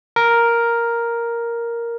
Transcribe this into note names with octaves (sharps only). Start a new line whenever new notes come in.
A#4